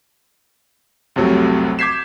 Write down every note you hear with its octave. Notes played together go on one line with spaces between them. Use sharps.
C2 F2 C3 F#3 A3
D6 G6 G#6 B6 C7 E7